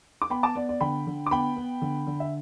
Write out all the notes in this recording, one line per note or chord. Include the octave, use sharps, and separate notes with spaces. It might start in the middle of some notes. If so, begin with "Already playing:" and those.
D6
B3 G5 B5
A5 D6
B3 D5
D5
D3 G5 B5
D3
D6
B3 G5 B5
B3
D3
D3
E5